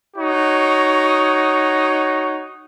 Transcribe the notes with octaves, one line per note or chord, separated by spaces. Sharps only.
D#4 F#4 C#5